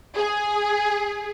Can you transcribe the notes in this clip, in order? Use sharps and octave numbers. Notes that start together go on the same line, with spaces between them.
G#4